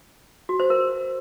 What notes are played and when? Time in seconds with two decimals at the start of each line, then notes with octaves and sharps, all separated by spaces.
0.49 F#4
0.60 C5
0.70 A#4